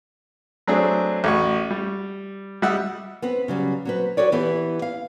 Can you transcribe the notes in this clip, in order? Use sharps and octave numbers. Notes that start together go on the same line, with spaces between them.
F#3 A3 C4 D4 G#4
A1 F#4 C#6
G3
G3 D#5 E5 F#5 E6
B3 C4 B4
C#3 F#3 G3
F#3 C4 B4
F#4 A4 B4 C#5 D5
E3 B3 E4 G4 B4
F5